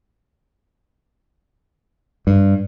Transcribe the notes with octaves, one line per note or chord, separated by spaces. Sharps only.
G2